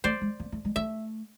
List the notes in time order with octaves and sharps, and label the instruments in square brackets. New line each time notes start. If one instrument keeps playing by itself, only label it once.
[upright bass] A3 [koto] C5 D5
[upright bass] G#3
A#3
A3
G#3
[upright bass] A3 [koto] E5